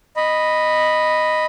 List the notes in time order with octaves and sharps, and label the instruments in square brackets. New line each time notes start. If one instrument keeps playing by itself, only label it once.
[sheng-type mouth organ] D#5 B5